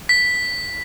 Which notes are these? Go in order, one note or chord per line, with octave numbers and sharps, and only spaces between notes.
B6